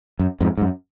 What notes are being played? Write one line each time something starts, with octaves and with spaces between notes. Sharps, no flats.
F#2
F2 G#2
G#2
F#2